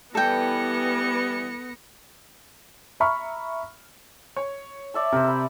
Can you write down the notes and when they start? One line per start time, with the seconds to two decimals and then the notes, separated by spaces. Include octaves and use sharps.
0.15 E3 G3 B3 A4 G5 A#6 C#7
3.00 E5 A#5 B5 C#6 F6
4.36 C#5
4.94 D5 E5 A5
5.12 C3 A#4 C5
5.24 E5 B5